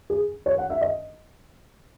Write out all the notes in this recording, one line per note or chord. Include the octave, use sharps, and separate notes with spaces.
G#4
C#5
F#5
E5
D#5